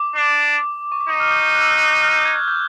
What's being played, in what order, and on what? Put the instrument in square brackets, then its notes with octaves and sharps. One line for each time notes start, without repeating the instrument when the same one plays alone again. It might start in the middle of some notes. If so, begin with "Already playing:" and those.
Already playing: [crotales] D6
[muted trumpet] D4
[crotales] C#6
D6
[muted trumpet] D#4 [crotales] D#6
[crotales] F6
G6
G6
F#6
E6
F6
E6
E6
F6
G6
G#6
G#6
G6